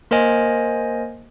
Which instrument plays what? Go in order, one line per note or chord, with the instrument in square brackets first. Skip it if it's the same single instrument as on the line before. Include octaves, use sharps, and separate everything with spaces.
[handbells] A#3 A#4 C5 D#5 G#5